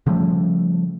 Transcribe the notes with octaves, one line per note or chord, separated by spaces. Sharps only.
C#3 F3 G3 A3